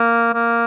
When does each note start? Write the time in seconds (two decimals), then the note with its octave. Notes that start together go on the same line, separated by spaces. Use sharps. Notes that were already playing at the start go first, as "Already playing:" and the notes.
Already playing: A#3
0.34 A#3